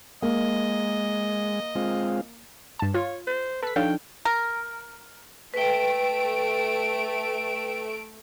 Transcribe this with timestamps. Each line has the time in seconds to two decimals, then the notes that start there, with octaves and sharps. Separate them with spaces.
0.22 G#3 A#3 D#5
1.75 G#3 C4 F4
2.79 G2 A5
2.94 F4 C#5
3.27 C5
3.63 A4 B4 B6
3.76 F3 D4 D#4 A4 C#5 F5 G5
4.25 A#4
5.54 A3 B4 G5 D7